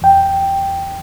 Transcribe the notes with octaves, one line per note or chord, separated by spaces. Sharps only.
E2 G5